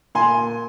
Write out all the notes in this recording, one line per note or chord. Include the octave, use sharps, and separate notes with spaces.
A#2 G#5 C6